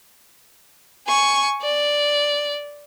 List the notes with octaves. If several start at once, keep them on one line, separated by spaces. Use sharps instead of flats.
G#5 C#6
D5